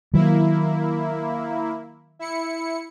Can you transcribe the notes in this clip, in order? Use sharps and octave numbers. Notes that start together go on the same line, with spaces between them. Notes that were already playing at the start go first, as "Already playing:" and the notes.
D#3 F#3 A#3 E4
E4 C#7